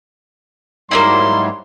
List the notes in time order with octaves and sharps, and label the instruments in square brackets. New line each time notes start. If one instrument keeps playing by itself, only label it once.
[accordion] G#2 F#3 G3 [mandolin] A#3 C#4 E4 [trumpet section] C6